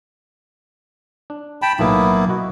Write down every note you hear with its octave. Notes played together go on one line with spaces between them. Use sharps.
D4
G5 A5 B5
B1 A2 A#3 B3 E4
E4 F#4 D#5